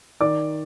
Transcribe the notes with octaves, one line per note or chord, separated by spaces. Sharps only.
D#3 D5 D6